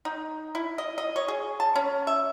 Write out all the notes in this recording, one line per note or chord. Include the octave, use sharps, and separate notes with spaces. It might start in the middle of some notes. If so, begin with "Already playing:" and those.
D#4
E4
D#5
D#5
C#5
G#4
A5
C#4
E5